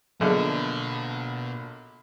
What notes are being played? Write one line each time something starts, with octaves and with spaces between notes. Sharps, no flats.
A#1 B2 D3 F3 F#3 G#4